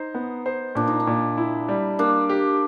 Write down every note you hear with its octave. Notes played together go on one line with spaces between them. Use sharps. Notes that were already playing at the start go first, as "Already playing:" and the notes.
Already playing: D#4 C5
B3
C5
A#2 D4
D#4
D4
A#2
E4
G3
A#3 D4
G4